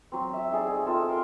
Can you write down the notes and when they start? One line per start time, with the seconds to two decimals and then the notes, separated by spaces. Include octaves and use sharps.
0.12 F#3 C4
0.33 E5
0.52 D#4 G#4 D5
0.67 G#4
0.86 C4 F4 A4 E6
1.10 A#4 C6